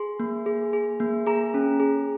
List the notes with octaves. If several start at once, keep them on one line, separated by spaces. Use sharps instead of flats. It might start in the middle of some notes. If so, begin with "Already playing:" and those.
Already playing: G#4 C6
A#3
G#4
G#4
A#3
G#4 A#5
C#4
G#4